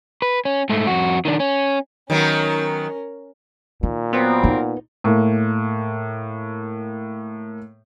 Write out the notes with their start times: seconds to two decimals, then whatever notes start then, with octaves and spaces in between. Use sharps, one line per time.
0.22 B4
0.45 C#4
0.69 G#2 A3
0.87 F2 F#4
1.25 D#3 D4
1.40 C#4
2.10 D#3 F#3 B3 C#4 A#4
3.83 A#2 D#3
4.13 F#3 B3 C4 A#4
4.44 D#4
5.04 A2 A#3